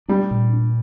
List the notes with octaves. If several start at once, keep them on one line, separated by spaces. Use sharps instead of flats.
G3 D4
A#2
D4